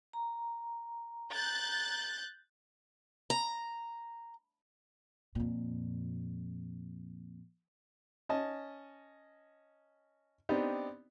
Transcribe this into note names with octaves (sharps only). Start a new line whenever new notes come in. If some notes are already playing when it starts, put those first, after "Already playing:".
A#5
F#6 G6 A6
A#5
F2 A#2
C#4 D#5 A5
B3 C4 D4 D#4 G4